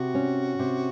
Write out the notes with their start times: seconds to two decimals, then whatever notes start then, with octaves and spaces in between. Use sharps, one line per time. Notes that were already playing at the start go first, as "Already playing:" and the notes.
Already playing: C3 F#4
0.15 C#4
0.59 C3